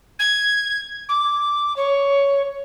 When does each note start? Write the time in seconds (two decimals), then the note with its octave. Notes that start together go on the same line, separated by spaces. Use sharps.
0.19 G#6
1.09 D6
1.76 C#5